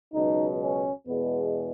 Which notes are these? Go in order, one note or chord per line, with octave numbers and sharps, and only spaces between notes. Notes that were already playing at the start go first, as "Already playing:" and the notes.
C#2 B2 F#3 D#4
C#4
E2 B2 G#3 B3